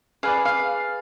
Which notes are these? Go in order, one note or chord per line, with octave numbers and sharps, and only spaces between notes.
G#4 B4 D5 F5
F5